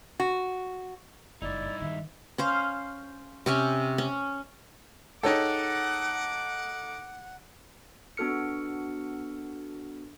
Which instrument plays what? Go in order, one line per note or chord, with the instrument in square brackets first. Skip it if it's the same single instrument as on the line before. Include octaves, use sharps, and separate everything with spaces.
[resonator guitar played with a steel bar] F#4
[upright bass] F#1 [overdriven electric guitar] G2 D#4 [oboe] E4 [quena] D5
[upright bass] D#3 [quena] E5
[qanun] C#4 C5 F5
C3 C#4 G#5
C#4
[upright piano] D#4 A4 [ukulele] G#4 C#5 G5 [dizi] F#5 [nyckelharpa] D6
[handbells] B3 D4 F#4 A4 F6 C#7